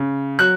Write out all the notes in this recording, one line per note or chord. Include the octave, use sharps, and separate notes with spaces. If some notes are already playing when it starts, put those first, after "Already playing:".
Already playing: C#3
F#3 F#6